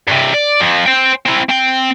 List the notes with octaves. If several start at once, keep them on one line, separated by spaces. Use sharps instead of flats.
G2 C3
D5
F2 F3
C5 G5
C4 E4
C4 G5